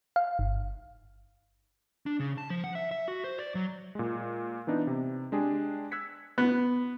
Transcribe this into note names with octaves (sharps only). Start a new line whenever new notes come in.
F5
G1
D4
C#3
A5
F3
F#5
E5
E5
F#4
C5
D5
F#3
A#2 G#3
E3 B3 D4 D#4
C3
G#3 D4 G4 G#4
E6 F#6 G#6 B6 C#7
B3